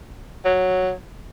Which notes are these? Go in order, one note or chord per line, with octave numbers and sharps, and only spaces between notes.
F#3